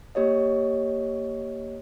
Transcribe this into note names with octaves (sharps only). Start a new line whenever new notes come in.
A#3 G4 C#5 D#5